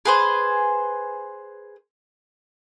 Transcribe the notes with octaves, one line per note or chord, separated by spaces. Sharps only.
G#4 B4 C5